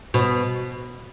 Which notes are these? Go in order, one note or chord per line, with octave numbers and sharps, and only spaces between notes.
B2